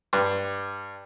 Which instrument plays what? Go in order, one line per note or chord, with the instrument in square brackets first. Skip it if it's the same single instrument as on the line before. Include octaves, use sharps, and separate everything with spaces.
[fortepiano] G2